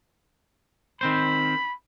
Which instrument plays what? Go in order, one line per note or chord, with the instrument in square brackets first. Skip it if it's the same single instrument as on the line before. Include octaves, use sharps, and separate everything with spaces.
[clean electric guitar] D#3 C4 C5 [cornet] B5